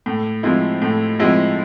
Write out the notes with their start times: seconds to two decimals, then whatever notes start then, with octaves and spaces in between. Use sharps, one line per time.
0.06 A2
0.43 F3 G#3 C4 E4
0.82 A2
1.20 F3 G#3 C4 E4